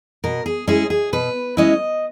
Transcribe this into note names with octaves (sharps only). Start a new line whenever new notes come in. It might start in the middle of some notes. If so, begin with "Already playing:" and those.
B2 A#4
G#4
G#3 C#4 E4 G#4
G#4
B2 B4
G#3 C#4 E4 D#5